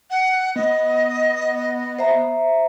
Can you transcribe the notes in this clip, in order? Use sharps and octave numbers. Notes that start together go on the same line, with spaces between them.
F#5
B3 D#5
C5 E5 A#5